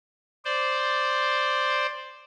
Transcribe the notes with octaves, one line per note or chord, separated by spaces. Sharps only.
C5 D5